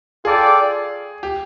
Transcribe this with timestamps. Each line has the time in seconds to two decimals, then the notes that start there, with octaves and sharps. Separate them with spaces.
0.25 F4 G#4 A4 D5 G5
1.23 G4